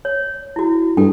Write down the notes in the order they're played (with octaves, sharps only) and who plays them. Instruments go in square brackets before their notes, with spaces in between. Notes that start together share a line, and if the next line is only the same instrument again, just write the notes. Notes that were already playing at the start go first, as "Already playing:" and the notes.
[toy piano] C#5
E4 F#4
[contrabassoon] G2 [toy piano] A4 G5